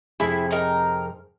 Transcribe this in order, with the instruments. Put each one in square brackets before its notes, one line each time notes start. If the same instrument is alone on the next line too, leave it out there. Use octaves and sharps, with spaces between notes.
[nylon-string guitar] F2 C3 G#4 [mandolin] E4
[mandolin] D#4 A#4